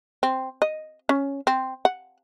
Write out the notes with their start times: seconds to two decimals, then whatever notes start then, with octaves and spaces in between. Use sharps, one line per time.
0.23 C4
0.62 D#5
1.09 C#4
1.47 C4
1.85 F#5